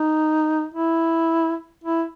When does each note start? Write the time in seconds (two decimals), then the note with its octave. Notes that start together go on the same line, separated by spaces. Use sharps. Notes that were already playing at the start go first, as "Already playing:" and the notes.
Already playing: D#4
0.74 E4
1.84 E4